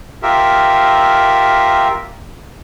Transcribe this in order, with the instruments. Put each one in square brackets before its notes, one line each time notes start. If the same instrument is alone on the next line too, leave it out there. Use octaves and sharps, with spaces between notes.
[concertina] F4 G4 A#4 E5